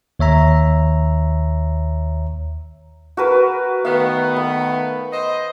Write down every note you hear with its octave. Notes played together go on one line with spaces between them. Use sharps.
D#2 C#5 E5 A#5
F#4 A#4 B4
D#3 A3 B3 F5
B5
C5 D#5